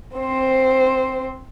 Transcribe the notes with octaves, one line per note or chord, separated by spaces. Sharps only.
C4 C5